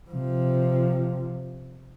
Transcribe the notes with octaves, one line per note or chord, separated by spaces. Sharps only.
C3 F3